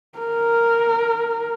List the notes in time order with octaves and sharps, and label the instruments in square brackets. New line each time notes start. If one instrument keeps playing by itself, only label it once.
[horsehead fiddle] A#4